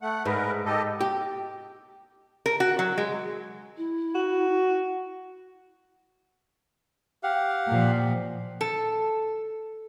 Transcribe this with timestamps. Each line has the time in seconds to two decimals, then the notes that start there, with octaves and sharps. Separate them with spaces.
0.02 A3 F#5
0.26 G#2 A#4 B4
0.65 G4 A4 D#5
1.01 G4
2.46 A#4
2.60 F#4
2.79 F#3
2.98 G#3
3.77 E4
4.15 F#4
7.23 G4 F5 F#5
7.68 A#2 F3
8.61 A4